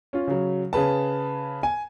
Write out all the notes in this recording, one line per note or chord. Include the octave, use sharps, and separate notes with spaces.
C#4 F4
C#3 F#3
C#3 G#4 B4 A5
G#5